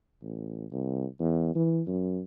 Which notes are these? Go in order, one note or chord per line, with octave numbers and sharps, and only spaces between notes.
A1
C2
E2
E3
F#2